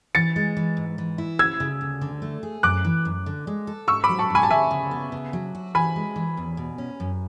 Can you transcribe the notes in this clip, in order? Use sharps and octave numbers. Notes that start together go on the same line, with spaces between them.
E3 A6 C#7
G#3
E3
G#2
E3
E4
D2 E6 G#6
C#3
D2
D3
A3
G#4
F#2 D6 F#6
E3
F#2
D3
G#3
A4
G#2 C#6 E6
B5 D6
F#3
A5 C#6
G#2 G#5 B5
A5
D2 E5 G#5
C#3
B3
C#3
F#3
F#4
E3 G#5 B5
G#3
E3
E2
B2
C#4
F#2